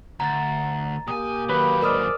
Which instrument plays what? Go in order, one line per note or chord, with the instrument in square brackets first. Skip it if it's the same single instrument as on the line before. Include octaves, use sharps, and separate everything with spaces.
[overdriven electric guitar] D2 [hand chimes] A#5 A6
[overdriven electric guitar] A#2 G#5 [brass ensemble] A#3 G4 [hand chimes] D#6
[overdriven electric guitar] D#2 F#3 [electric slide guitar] B4
[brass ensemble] G#3 C5 D5 [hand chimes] A#4 D#6 F6